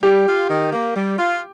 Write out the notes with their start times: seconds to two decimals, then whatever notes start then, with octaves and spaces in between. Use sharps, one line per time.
0.03 G3 G4
0.27 F4
0.49 D#3
0.73 A#3
0.95 G3
1.18 F4